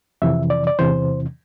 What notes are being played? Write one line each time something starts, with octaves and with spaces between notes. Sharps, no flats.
F2 C3 E3 E5
D5
D5
E2 C3 E3 C5